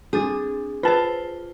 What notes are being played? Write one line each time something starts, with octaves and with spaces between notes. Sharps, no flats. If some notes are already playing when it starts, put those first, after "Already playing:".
C4 D4 G#4
F4 B4 C5 A5